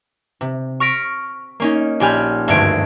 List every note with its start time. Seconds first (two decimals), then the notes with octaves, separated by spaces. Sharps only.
0.41 C3
0.80 C#6 F6 A#6 B6 D7
1.60 A#3 C#4 D#4
2.00 A#1 G4 G5 G#5 B5 F6
2.48 G#1 D2 G2 A3 G#6 D7